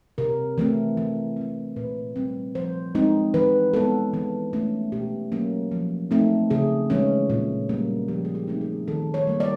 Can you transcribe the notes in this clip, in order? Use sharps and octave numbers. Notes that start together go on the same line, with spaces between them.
C3 A#4
E3 A3 C4
E3
A3 C4
A#2 B4
G3 C4
F3 C5
G#3 C4 D#4
E3 B4
G#3 B3 A4
E3
A3 C#4
B2 G4
F#3 A#3 C#4
F3
A3 C4 D#4
C#3 G#4
E3 G#3 C#4
A#2
G3 A#3 C#4
F3 G4
G#4
G4
A3 C4 D#4
G#4
D#3 A4
C#5
G3 A#3
D5